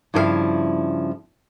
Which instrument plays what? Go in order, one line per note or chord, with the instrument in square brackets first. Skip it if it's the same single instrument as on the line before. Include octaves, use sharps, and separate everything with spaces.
[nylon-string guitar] G2 C#3 F3 E4 B4 F5